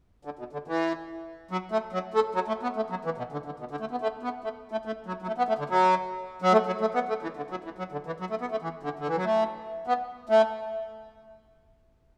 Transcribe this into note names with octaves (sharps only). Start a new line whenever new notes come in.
D3
B2
D3
E3
F#3
A3
F#3
A3
F#3
A3
B3
A3
F#3
E3
B2
D3
D3
B2
D3
A3
B3
A3
B3
A3
A3
A3
F#3
F#3
A3
B3
A3
D3
F#3
F#3
A3
F#3
A3
B3
A3
E3
D3
F#3
E3
F#3
D3
E3
F#3
A3
B3
A3
E3
D3
D3
E3
F#3
A3
B3
A3